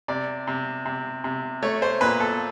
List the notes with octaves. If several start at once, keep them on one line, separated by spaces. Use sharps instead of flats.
C3 D5
C3
C3
C3
A3 C#5
C5
A#2 B4
A4